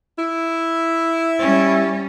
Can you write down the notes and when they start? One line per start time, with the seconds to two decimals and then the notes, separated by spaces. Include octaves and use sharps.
0.19 E4
1.39 G3 C#4